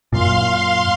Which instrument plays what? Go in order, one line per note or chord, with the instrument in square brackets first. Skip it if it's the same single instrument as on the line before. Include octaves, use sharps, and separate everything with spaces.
[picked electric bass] F#2 A#2 [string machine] F5 C6